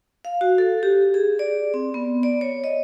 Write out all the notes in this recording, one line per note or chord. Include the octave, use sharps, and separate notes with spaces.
F5
F#4
A4
G4
G#4
D5
C4
B3
D5
C#5
D#5